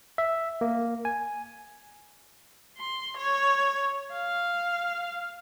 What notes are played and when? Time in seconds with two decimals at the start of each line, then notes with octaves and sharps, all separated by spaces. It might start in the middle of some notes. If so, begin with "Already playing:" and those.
0.18 E5
0.61 A#3
1.05 G#5
2.78 C6
3.17 C#5
4.12 F5